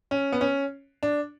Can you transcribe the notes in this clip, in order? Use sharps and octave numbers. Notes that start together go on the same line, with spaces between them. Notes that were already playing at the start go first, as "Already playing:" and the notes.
C#4
B3
C#4
D4